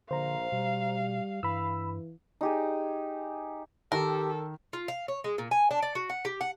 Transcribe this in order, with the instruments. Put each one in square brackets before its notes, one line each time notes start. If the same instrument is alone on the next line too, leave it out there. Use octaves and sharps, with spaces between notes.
[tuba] A#1 [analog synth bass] D3 [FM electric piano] C5 A#5 [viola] F5
[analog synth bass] B2 [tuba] G3
[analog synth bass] G2 [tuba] E3 [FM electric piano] B5 E6
[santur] D#4 G4 G#4
[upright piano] D#3 [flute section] G4 [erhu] A4 [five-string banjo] A#4
[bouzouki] F4
F5
C#5
G#3
A#2
G#5
D4
D5
F#4
F#5
G4
F#5